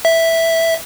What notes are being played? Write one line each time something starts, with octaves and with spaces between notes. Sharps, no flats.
E5